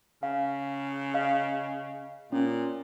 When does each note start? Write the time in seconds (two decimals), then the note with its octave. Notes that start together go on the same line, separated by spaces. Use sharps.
0.23 C#3 F5
1.14 D#5 F5
2.32 A#2 C#4